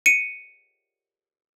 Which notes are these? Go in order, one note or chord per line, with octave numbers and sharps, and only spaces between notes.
C#7 D#7